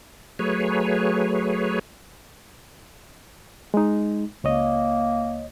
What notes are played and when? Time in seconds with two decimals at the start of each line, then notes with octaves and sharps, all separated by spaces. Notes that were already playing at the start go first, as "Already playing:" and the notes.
0.39 F#3 A3 G#4 B4 C#5
3.74 G#3 D#4
4.44 C#2 A#3 C#5 D#5